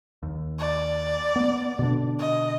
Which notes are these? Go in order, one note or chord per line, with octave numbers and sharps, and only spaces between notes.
D#2
D5
B3
B2 D3 D4
D#5